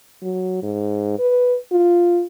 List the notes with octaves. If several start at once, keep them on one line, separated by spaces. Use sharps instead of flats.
F#3
G#2
B4
F4